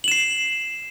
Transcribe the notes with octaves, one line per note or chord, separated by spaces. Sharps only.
C7 E7 F#7